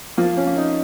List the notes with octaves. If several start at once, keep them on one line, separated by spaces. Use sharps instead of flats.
F3 A#3 F4
C#4
A#3
D#4